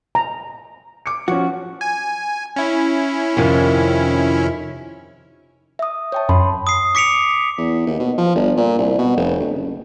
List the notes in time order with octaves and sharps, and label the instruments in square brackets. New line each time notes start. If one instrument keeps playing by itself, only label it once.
[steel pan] A#5
[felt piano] D6 C#7
[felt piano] F3 C#4 [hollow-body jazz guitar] F#4
[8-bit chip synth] G#5
C#4 E4
[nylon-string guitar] F2 C3 D#3
[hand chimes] E5 D#6
C#5 G5 A5
[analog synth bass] F#2 [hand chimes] A5 B5 C6
[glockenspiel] D#6 C7
D6 B6 C#7 D7 F7
[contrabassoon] E2
D#2
B2
F3
G1
A#2
C2
B2
F1
D2
F#1